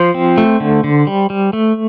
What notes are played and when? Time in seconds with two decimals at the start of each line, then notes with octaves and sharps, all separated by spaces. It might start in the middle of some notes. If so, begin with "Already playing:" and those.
Already playing: F3 C5
0.14 C4
0.38 A3
0.60 D3
0.84 D3
1.07 G3
1.30 G3
1.53 A3